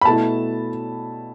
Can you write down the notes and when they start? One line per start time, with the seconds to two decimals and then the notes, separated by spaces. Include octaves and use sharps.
0.01 B5
0.05 B2 A3 E4 A5